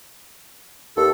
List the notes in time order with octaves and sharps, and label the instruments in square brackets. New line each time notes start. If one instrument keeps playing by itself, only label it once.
[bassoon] D#2 [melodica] A4